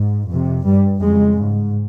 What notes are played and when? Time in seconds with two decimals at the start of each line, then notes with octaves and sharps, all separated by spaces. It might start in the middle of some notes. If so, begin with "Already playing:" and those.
Already playing: G#2
0.28 F2 C3
0.64 G2 G3
1.01 F2 C#3 G#3
1.39 G#2